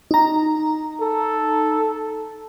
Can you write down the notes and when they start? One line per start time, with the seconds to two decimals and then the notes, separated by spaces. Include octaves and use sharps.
0.11 D#4 A#5
1.01 A4